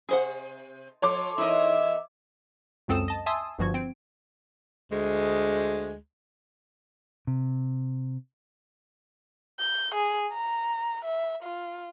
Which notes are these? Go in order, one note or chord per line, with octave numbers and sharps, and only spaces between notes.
C3 G#4 C5 F#5
F3 A4 C#5 C6 D6
E2 D#4 E4 A#4 D#5 E5
C#2 F#2 C4 A4 D#6 E7
D#5 A5
E5 G#5 A5 C6 D#6 E6
G1 G2 F3 F#4 G#6
C4 D7
D2 G#3
C3
G6
G#4
A#5
E5
F4